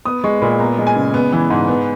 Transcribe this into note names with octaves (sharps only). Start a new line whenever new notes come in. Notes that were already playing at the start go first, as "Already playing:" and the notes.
B3 D#6
G#3 C#6
A#2 B5
B3 A#5
G#3
G#5
C#3
B3
E3
G#2
B3